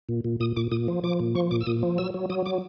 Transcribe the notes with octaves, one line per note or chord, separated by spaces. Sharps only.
A#2
A#2
A#2 D#6
A#2 D6
A#2 D#6
F3
F3 D6
A#2
F3 C#6
A#2 D6
E6
A#2 D#6
F3
F#3 E6
F#3
F#3 D#6
F#3 D6